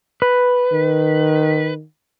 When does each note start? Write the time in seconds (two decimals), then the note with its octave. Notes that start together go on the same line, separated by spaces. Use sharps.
0.22 B4
0.72 D#3